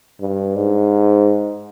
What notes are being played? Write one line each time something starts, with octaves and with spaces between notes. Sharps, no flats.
G2
G#2